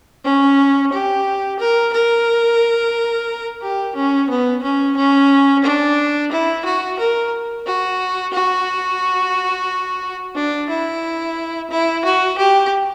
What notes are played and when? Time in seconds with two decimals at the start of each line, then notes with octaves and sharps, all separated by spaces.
0.24 C#4
0.93 G4
1.59 A#4
1.93 A#4
3.62 G4
3.95 C#4
4.30 B3
4.63 C#4
4.96 C#4
5.64 D4
6.32 E4
6.65 F#4
6.99 A#4
7.66 F#4
8.33 F#4
10.35 D4
10.69 E4
11.70 E4
12.05 F#4
12.38 G4